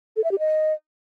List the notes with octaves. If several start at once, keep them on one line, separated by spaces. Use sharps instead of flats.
A4
E5
G4
D#5